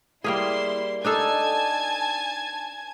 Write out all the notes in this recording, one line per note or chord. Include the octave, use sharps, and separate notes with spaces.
G3 A#3 E4 G#4 C6
D4 D#4 A4 G#5 A5 G#6